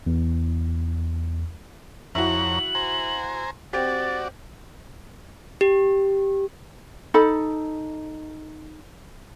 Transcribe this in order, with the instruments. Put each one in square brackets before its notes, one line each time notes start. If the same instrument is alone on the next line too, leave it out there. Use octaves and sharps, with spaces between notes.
[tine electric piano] E2
[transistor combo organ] F2 C#5 A#5 [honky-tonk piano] E4 F#4 [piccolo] F#7
[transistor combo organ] C5 G#5 A#5
[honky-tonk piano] C4 G4 [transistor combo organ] F#4 D5 [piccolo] A6
[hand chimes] G4
[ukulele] D#4 A4 B5